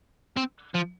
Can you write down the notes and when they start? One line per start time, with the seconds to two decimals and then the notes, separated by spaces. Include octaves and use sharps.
0.37 C4
0.75 F3